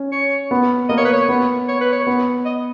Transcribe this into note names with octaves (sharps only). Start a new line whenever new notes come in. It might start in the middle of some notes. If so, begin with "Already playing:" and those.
Already playing: C#4
C#5
B3
A#3 D#5
C#5
B4
C#5
B3
C#5
B4
C#5
B3
D#5